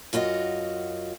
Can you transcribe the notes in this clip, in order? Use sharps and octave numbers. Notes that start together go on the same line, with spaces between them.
F#2 F4 F#4 A#4 D#5